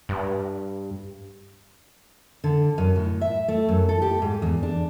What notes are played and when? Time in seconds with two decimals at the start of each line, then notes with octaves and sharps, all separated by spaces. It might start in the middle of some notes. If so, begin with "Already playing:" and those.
0.09 G2
2.44 D3
2.78 F#2
2.96 A2
3.21 E5
3.48 A3
3.69 F#2
3.89 A4
4.02 G4
4.22 G#2
4.42 E2
4.63 D4